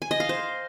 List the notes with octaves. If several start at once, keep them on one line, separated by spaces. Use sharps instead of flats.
G#5
D#5
F5
C5